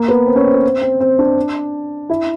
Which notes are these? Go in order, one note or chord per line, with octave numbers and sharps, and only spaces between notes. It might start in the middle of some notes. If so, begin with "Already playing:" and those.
Already playing: A#3
B3
C4
C#4
C4
B3
C4
C4
C4
D4
E4